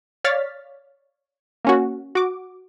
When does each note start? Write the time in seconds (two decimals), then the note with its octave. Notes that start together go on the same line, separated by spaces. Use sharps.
0.24 C#5 D5 F5 F6 A6 B6
1.65 A#3 C#4 F#4
2.15 F#4 D6